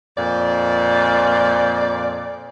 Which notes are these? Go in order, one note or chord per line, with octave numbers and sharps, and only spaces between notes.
F2 A#2 D5